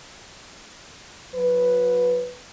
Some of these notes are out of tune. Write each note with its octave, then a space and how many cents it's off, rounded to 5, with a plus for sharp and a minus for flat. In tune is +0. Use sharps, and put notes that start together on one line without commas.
F#3 -35 B4 +0